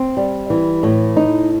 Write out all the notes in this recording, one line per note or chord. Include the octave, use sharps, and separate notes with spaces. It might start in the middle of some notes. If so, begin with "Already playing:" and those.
Already playing: C4
G3
E3
A2
D#4